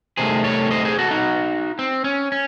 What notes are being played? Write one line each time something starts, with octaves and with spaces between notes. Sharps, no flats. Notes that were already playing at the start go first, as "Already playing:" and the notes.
C2 C3 D#3 A3 G#4 C5
A4 C#5
C5 D#5
G#4 C5
F#4 A4
D#4 F#4
C4
C#4
C#4